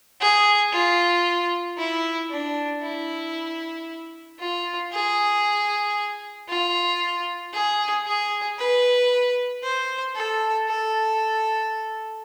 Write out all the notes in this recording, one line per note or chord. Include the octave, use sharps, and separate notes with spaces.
G#4
F4
E4
D4
E4
F4
G#4
F4
G#4
G#4
B4
C5
A4
A4